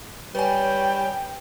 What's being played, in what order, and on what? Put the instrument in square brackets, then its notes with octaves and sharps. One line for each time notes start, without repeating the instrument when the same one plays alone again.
[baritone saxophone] G3 [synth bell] B4 G#5 [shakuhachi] C#5 [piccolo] G5